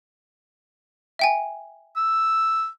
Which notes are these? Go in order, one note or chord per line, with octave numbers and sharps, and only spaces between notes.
E5 G5 G#5
E6